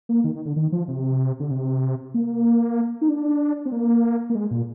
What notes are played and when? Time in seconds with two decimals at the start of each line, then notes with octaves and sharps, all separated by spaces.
0.09 A#3
0.24 D#3
0.35 D#3
0.46 D3
0.56 D#3
0.72 F3
0.88 C3
1.40 D3
1.51 C3
2.14 A#3
3.01 D#4
3.09 D4
3.66 C4
3.72 A#3
4.30 A#3
4.35 G#3
4.51 A#2